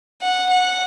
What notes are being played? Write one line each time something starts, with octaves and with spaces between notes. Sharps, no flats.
F#5
F#5